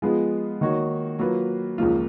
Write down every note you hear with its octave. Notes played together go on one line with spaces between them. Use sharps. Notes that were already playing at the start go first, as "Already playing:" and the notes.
F3 G#3 B3 F4 G#4
D#3 A#3 D#4 F#4 C#5
F#3 A#3 F4 B4
C#2 C#3 F3 A#3 F4